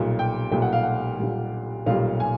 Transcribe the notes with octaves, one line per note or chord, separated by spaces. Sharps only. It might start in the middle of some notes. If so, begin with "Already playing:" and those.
Already playing: B1 A#2 G3
G5
B1 A#2 G3 G5
F#5
F5
F#5
B1 A#2 G3
B1 A#2 G3 F5
G#5